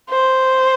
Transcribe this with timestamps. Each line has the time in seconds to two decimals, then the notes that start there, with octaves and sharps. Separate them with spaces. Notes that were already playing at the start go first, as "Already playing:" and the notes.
0.10 C5